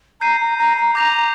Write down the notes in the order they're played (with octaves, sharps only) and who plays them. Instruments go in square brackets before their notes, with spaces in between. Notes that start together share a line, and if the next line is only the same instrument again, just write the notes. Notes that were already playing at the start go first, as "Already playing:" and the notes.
[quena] A#5 [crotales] G6 C7 D#7
[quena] A#5
A#5
A#5
[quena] A#5 [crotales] D6 G6 A#6 F7
[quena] A#5